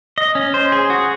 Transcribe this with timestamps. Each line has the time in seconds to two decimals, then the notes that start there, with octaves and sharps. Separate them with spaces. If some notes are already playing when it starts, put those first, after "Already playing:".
0.18 D#5
0.35 C#4
0.54 C5
0.72 G#4
0.90 F#4